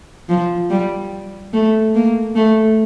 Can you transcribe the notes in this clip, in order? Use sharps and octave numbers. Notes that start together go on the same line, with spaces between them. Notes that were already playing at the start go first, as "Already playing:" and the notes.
F3
G3
A3
A#3
A3